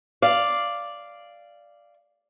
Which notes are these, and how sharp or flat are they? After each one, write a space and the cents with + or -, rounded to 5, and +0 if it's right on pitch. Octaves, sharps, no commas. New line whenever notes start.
D5 +0 F5 -10